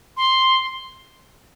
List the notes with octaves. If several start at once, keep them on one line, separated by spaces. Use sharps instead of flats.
C6